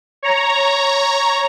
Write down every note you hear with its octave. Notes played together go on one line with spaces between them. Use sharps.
C#5 A#5